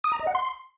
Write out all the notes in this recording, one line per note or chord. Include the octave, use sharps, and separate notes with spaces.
D#6
A#5
D#5
F#5
C6